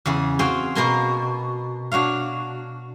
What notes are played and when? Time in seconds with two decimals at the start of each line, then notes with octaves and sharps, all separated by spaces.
0.06 E2 C#3 G#4
0.39 C4 F#4 G#4 F5 G5 G#5
0.75 B2 A#3 G#4 A#4 G#5 C6
1.92 D4 F#4 C#5 F5